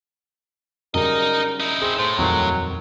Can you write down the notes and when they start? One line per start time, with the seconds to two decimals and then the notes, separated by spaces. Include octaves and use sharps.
0.94 F#2 C#3 G3 D#4 A#4 D#5
1.60 D#4 E4
1.82 C4 G#4
1.99 A2 C5
2.18 D#1 F2 D#3 F#3